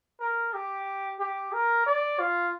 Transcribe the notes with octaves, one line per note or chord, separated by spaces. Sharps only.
A#4
G4
G4
A#4
D5
F4